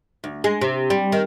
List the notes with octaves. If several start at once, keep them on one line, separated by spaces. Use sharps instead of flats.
D2
G#3
C3
G3
D#3